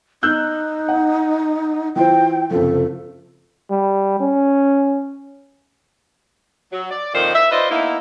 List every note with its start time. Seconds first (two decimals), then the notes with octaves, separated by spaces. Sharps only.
0.23 D#4 E6 F#6 G6
0.88 F#5
1.96 E3 F4 C5 G5
2.51 F#1 C3 F3 A4
3.70 G3
4.20 C#4
6.72 F#3
6.91 D5
7.14 F2 A#2 D#3 C5
7.34 E5
7.51 F4 B4 C5 D5 D#5
7.71 A#3 B3 D#4 E4